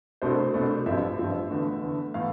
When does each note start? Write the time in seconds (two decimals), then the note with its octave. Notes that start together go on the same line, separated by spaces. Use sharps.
0.22 C2 B2 A3 D4 C5
0.54 C2 B2 A3 D4
0.86 A1 G2 F3 C4 E5
1.18 A1 G2 F3 C4
1.50 E2 D3 A3
1.82 E2 D3 A3
2.14 A2 E3 B3 F5